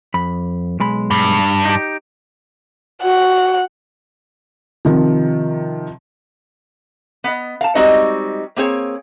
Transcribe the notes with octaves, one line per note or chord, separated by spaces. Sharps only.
F2 B5
B1 G#3 B5
G2
D#4 G4
F#4 F#5
C3 D#3 F3
B3 D#5
F5 A5
G3 G#3 C4 D#4 F#4 D#5
A#3 C4 G#4 C#5